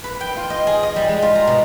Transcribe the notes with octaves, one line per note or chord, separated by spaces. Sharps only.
B4
G5
F4
D#5
G#4
D#5
G3
G#3
F4
A#5
B2